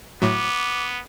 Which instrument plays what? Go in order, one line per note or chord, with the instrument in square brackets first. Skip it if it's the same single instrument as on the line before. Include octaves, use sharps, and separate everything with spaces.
[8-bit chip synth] A2 F#3 [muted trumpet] B3 [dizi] D6